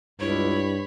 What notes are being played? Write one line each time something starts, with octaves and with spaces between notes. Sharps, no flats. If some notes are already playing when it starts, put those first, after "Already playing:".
C#2 G2 E4 C#5 B5